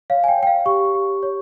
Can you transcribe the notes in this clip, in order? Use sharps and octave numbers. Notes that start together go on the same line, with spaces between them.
C#5 F5
G#5
G5
C#5
G5
F5
G4 C#6
G4
C#5